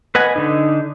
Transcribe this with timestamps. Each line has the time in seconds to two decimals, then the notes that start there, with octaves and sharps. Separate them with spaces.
0.15 B4 D#5 F#5 G#5
0.36 D3 D#4